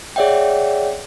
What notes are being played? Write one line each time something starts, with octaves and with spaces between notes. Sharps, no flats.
G#4 C#5 D5 E5 F#5 G5